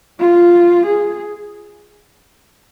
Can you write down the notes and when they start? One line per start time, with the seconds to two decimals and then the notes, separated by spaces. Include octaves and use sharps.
0.19 F4
0.86 G#4